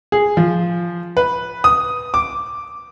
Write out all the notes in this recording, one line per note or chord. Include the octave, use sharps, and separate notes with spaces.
G#4
F3
B4
D#6
D6